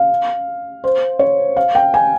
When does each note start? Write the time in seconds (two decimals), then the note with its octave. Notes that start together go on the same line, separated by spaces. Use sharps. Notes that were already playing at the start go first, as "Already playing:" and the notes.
Already playing: F5
0.84 C5
1.19 C#5
1.57 F5
1.75 G5
1.94 G#5